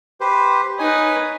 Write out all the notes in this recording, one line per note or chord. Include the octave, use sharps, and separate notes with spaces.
G4 B4 C5
D#4 B4 C#5 G#5